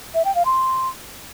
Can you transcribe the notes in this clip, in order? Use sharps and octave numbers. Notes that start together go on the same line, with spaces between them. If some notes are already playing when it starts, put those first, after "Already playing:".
E5
G5
F5
C6